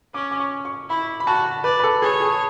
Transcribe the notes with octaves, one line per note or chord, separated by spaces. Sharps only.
C#4 D6
D6
C#6
C#6
E4 B5
B5
F#4 A5
B4 D5
B4
A4
G#4 C#5
G#4